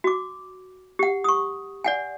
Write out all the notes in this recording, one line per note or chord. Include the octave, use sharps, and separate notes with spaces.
F#4 D6
G4 F#5
C#6 D#6
D5 F#5 G#5